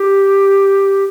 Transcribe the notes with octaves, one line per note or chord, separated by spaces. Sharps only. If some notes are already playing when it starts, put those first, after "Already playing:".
Already playing: G4